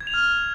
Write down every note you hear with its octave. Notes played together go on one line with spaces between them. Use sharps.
G#6
F7
F6